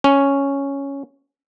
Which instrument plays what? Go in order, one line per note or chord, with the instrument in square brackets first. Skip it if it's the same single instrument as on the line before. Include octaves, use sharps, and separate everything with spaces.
[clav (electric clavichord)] C#4